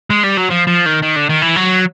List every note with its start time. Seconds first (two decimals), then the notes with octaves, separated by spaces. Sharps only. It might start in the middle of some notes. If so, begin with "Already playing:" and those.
0.10 G#3
0.23 G3
0.37 F#3
0.50 F3
0.67 F3
0.86 D#3
1.03 D#3
1.16 D3
1.29 D#3
1.42 E3
1.56 F#3